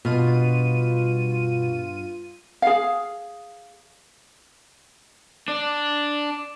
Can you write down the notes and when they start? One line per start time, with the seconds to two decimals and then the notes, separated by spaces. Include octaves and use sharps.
0.05 G2 B2 F4 D#7
2.62 G#4 F5
5.48 D4